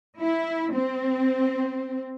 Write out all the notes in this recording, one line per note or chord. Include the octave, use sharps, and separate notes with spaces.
E4
C4